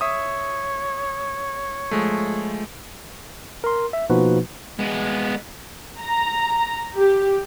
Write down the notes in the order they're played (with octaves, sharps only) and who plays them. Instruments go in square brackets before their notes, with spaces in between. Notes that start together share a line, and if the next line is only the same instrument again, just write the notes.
[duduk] C#5 [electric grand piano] E5 D#6
[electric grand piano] F3 G#3 A3
[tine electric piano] A#4 C6
E5
B2 F3 A#3 D#4 F#4 B4
[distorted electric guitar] G#3 B3
[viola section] A#5
G4